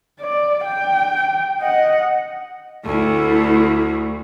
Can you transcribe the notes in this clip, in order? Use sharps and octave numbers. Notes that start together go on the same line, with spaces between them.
D5
G5
D#5 F#5
D2 A3 E4